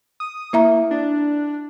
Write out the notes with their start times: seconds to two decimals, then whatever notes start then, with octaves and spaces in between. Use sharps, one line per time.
0.20 D#6
0.53 A#3 E4 E5 A#5
0.91 D4